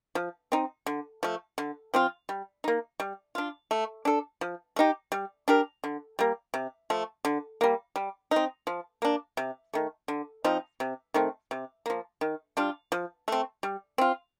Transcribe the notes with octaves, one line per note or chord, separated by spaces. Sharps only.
F3
C4 D#4
D3
F3 A3
D3
F3 C4 F4
G3
A#3 D#4
G3
D4 F4
A3
D4 A4
F3
A3 D#4 G4
G3
D4 G4 A#4
D3
G3 A#3
C3
F3 A3
D3
G3 A#3
G3
C4 D#4
F3
A#3 D4
C3
D#3 A3
D3
F3 C4 D#4
C3
D#3 A3 C4
C3
F3 A#3
D#3
G3 D4 F4
F3
A3 C4
G3
C4 F4